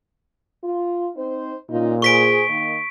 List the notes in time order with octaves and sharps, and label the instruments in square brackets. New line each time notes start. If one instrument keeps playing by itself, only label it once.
[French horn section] F4
C4 D#4 C5
[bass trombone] A#2 [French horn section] C#4 D#4 F4
[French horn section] G#4 C5 [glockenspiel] C#6 B6 D7
[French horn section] D#3 A#3